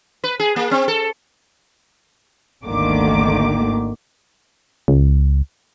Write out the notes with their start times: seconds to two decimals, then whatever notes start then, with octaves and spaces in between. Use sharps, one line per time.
0.24 B4
0.40 G#4
0.56 A#3
0.71 C4
0.88 A4
2.64 G#1 D2 D3 D#3 A#3 D6
4.88 C#2